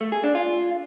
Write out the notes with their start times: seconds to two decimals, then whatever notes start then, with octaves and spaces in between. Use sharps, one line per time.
0.01 A3
0.12 G#4
0.24 D4
0.35 F4